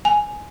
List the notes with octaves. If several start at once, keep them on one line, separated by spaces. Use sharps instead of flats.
G#5